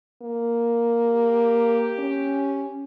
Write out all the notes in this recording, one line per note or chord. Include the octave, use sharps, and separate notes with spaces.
A#3
G4
C#4